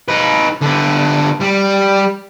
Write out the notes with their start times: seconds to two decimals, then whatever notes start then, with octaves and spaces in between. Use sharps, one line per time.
0.09 D#4 B4
0.61 D3 B3
1.40 G3